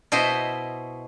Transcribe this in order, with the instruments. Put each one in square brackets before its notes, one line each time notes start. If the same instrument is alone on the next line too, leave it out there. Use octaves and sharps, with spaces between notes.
[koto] B2 E4 C5 D#5